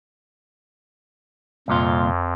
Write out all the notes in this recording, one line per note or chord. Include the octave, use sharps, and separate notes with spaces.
C2 F2 A#2 F4